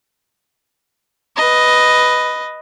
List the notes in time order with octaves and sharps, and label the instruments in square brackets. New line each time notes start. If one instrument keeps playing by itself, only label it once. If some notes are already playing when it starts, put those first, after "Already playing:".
[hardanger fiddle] B4 D#5